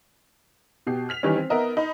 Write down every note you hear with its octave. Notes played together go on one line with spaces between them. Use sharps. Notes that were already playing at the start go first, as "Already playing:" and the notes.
B2 G4 C7
F6 B6 F7
D#3 E3 G3 C#4
C4
B3 D#4 A#4 D#5 E5
D#4 B5